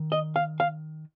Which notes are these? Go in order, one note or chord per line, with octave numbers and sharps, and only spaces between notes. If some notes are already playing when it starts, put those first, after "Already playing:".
Already playing: D#3
D#5
F5
F5